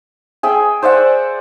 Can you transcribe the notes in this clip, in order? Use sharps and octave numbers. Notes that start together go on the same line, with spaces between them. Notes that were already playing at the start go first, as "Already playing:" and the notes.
G#4 E5 G5
C5 D5 E5 F#5